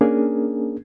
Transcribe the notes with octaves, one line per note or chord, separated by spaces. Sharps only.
A#3 C#4 D4 G#4 A#4